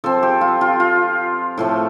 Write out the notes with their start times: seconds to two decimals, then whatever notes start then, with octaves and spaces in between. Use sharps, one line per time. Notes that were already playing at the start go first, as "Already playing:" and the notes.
0.04 F3 C4 A4
0.23 G4
0.41 F4
0.61 F4
0.80 F4
1.58 A2 F3 A3